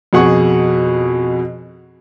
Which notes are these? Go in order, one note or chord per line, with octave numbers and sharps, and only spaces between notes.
F2 B2 G#4 F#5 C#6